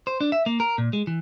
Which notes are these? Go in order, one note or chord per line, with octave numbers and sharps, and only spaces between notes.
C5
D4
E5
A#3
A#4
A#2
G#3
E3